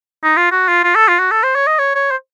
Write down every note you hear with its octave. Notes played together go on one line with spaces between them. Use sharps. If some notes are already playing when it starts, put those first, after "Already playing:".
D#4
F4
F#4
F4
F4
A4
F4
F#4
A4
C5
C#5
D#5
C#5
C#5
C5